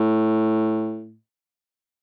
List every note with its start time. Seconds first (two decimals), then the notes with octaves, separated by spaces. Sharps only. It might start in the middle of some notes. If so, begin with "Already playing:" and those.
Already playing: A2